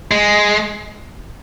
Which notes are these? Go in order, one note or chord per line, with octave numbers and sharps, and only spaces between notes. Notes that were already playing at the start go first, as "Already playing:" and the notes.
G#3